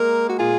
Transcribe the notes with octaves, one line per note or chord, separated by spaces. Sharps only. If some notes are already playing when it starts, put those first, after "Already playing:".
Already playing: G#3 A#3 A#4
F#4
A#2 F4 G#4